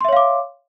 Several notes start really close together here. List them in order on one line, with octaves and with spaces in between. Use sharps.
C6 E5 C#5 F5 D6